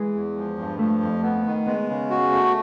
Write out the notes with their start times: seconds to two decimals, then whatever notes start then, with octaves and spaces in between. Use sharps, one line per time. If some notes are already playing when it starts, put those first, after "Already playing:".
Already playing: E3 G#3
0.14 E2
0.37 F3
0.58 G2
0.79 F3 A3
1.02 F2
1.23 B3
1.45 D#3
1.66 G#3 B3
1.89 C#3
2.10 F#4
2.32 A3